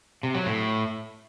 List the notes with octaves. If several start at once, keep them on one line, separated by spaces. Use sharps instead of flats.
C3
F#3
A2